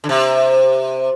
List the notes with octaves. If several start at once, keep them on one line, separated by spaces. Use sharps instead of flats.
D3
C3